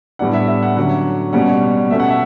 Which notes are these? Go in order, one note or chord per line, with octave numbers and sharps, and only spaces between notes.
A2 G3 B3 D4 F#5
E5
E5
F#5
D3 F#3 C#4 F#5
B2 G3 C#4 F#5
B2 A3 C#4 E5
F#5
E5